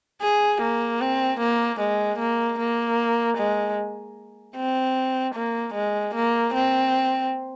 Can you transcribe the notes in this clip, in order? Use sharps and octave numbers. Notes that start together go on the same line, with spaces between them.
G#4
A#3
C4
A#3
G#3
A#3
A#3
G#3
C4
A#3
G#3
A#3
C4